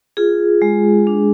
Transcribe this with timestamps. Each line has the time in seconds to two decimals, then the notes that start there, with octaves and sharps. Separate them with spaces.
0.17 F4 G#4
0.62 G#3
1.07 D4